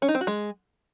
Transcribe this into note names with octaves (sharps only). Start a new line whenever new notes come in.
C#4
D#4
C4
F#4
G#3